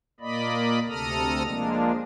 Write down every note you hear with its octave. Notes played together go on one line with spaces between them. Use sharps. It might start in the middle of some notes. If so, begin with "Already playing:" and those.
A#2 A#3 D5 D#5 B5
D2 C3 A4 A#5 D#6 F6
F3 G#3 A#3 D4